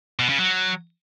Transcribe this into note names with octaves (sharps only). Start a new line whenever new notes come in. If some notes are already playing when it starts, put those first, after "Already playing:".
B2
C#3
F#3